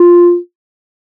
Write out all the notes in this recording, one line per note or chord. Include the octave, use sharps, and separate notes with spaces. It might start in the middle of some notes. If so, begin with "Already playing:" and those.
Already playing: F4